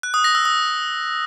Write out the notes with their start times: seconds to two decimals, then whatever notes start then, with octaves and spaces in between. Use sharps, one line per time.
0.03 F#6
0.14 D#6
0.24 A#6
0.35 E6
0.45 D#6